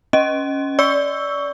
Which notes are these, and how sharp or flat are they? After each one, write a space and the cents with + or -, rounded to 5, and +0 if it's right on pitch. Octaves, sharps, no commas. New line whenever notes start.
C#4 +0 D#5 +0
D5 -25 C#6 +15 E6 +0